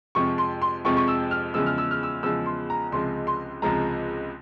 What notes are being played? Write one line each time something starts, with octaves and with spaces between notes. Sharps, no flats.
F2 C3 F3 G#3 C#6
C6
C6
F2 C3 F3 G#3 C#6
C#6
E6
F6
E2 C#3 F3 G#3 E6
F6
E6
F6
E6
E2 C#3 F3 G#3 E6
C6
A#5
C#2 C3 F3 G#3 C6
C6
C#2 C3 F3 G#3 A#5